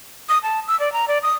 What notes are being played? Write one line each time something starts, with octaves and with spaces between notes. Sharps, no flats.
D#6
A5
E6
D5
A#5
D5
D#6